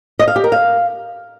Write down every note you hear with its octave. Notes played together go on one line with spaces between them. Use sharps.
D#5
F5
G4
A#4
F5